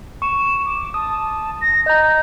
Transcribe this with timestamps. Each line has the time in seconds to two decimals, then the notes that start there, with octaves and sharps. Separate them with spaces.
0.22 C#6 E7
0.66 D6
0.94 A5 D#6
1.61 A#6
1.86 D#5 A#5 G6